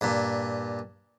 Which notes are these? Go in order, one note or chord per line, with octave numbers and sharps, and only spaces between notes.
G2 A#2